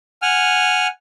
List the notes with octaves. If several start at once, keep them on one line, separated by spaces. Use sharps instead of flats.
F#5 G#5 F6